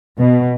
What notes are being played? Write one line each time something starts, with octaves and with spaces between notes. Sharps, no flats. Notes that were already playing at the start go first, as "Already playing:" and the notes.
B2